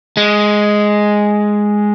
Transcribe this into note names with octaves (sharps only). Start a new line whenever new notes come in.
G#3